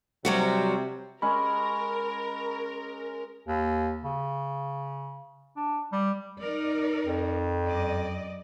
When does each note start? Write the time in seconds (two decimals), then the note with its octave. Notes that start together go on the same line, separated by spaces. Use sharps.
0.25 C3 F#3 G3 F#4
1.22 G#3 C#4 A#4 B5
3.48 D#2
4.04 C#3
5.56 D4
5.92 G3
6.41 D#4 A#4 D5
7.06 F2
7.67 F#2 D5 D#5